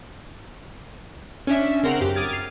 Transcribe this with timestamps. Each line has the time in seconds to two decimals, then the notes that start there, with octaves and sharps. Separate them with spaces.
1.47 C#4 D4 E5
1.83 C#3 C4 A#4 C5 F#5 A#5
2.01 F#2 G4
2.15 D6 D#6 F6 G#6 A6
2.32 F6 C7 D#7